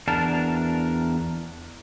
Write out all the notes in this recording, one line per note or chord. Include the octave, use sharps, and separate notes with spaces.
E2 D4 A#4 A5